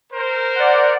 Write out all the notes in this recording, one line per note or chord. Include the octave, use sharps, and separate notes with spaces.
A#4 C5
D5 F#5